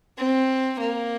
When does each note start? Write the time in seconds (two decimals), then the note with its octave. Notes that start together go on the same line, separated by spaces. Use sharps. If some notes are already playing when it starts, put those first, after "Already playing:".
0.18 C4
0.79 A#3